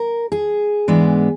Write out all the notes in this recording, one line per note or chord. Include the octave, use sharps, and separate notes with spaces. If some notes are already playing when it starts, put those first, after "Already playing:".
Already playing: A#4
G#4
G#2 E3 G#3 B3 D4